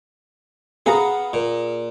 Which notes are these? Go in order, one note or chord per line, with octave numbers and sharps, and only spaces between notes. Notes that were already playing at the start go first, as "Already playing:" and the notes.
B3 G#4 F5 A#5
A#2